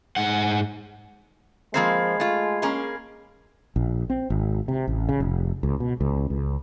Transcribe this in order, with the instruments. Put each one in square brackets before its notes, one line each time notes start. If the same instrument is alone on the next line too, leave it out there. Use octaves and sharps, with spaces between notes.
[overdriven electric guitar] G#2 F#5
[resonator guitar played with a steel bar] F3 A#3 C4 [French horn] G#3 [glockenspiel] B5 G#6 C7
[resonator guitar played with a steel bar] A3 F4
A#3 C#4 G#4
[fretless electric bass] A#1
C4
G#1
C3
A1
C#3
F1
C#2
B2
C#2
C#2